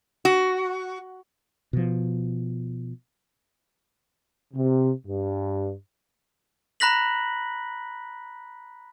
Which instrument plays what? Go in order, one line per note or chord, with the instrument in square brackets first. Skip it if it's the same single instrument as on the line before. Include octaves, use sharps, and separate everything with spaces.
[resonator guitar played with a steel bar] F#4
[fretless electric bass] B2 F3
[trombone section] C3
G2
[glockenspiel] A#5 B5 F#6 A#6 B6 F#7